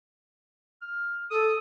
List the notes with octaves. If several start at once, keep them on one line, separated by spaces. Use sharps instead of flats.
F6
A4 D#6